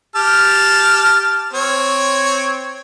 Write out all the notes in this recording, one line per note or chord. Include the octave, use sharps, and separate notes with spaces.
G4 A5 F6
C4 C#5